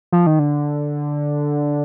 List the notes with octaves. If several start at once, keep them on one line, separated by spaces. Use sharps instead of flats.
F3
D#3
D3